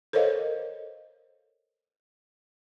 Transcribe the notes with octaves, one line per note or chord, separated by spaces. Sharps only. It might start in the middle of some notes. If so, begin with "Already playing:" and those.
A4 A#4 C5 C#5 D#5 F5